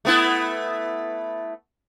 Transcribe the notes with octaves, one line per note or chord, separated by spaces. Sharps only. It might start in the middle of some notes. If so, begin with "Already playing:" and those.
A3 B3 E4